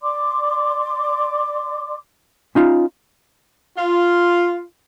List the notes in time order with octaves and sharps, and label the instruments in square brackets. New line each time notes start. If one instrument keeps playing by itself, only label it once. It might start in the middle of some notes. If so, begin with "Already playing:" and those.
[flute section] D5 C6 D6
[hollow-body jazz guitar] C#4 D#4 F4
[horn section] F4